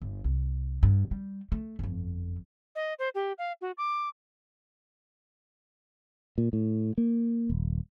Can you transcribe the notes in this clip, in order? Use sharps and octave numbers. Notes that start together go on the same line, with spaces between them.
G1
C2
G2
G3
A3
G1 F2
D#5
C5
G4
F5
F#4
D6
A#2
A2
A#3
D#1